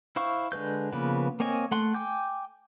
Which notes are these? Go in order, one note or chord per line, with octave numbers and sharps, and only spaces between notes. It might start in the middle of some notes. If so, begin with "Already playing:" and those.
E4 C5 F5 C#6
D3 G#3 B4 G6
C#3 F3 A#3 B3 B4
A#3 C4 C#5 D#5 G#5
A3 F#5 C6
G5 G#5 D6 G6